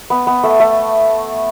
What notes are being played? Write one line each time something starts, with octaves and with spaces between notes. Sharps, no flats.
B3
B3
A3
A3